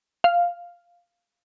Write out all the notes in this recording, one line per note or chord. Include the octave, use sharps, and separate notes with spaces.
F5